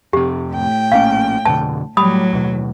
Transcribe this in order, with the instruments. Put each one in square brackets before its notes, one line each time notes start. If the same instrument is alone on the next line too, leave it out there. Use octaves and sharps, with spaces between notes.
[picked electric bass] F2 C3 [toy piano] G4
[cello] A2 G5
[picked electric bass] A#1 A#3 C#4 [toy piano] F5
[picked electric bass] F2 B2 D3 [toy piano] A5
[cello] A2 F#3 [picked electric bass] G3 [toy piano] B5 D#6
[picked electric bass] D#2 B2